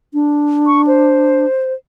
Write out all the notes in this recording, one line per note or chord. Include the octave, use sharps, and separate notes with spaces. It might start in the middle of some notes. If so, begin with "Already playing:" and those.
D4
C#6
C5